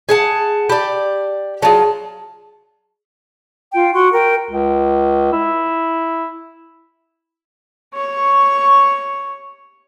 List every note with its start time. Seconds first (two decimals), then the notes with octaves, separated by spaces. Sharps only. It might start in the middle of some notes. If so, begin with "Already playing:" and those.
0.09 G#4 F#5 A5
0.69 G4 D5 A5 B5
1.62 F#3 F4 G#4 D5 A5
3.72 F4 G5
3.93 F#4 C6 C#6
4.12 A#4 G5
4.50 C#2
5.32 E4
7.94 C#5 C#6